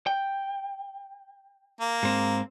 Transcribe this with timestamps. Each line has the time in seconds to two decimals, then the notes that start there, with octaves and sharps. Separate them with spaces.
0.07 G5
1.81 A#3
2.03 G#2 C4